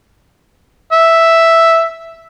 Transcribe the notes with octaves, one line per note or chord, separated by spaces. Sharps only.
E5